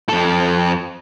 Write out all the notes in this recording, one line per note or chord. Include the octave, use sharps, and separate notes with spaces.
F2 A4